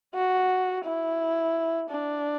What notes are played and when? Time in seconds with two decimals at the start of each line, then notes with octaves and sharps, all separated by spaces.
0.15 F#4
0.85 E4
1.90 D4